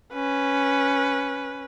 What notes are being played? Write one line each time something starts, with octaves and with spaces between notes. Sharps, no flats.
C#4 B4